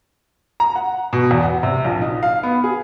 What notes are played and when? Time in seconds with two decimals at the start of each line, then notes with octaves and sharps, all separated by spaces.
0.60 A#5
0.76 F#5
1.13 B2
1.31 E2
1.43 F#5
1.63 C3
1.84 A#1
2.02 D#4
2.23 F5
2.43 B3
2.64 G#4